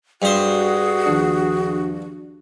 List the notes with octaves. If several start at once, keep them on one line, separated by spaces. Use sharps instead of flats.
G2 F#4 G#4 C5
D#2 F3 D4